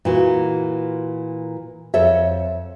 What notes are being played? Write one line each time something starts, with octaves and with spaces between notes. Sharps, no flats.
A#2 E3 F#4
F2 A4 C#5 E5